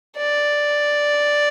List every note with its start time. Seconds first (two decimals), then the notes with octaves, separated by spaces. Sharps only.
0.17 D5